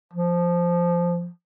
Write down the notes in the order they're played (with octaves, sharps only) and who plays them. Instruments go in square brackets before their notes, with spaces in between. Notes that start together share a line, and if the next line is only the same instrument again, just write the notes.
[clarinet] F3